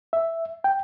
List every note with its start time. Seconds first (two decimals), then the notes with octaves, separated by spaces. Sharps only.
0.13 E5
0.64 G5